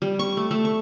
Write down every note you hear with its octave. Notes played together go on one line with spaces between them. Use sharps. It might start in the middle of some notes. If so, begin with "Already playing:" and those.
G3
C#6
A3
A3
C#6